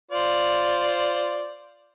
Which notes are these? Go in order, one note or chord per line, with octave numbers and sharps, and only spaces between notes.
F4 C5 D5